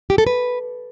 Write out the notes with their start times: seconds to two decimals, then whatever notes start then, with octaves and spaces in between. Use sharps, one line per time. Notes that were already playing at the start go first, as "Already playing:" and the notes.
0.10 G4
0.18 A4
0.27 B4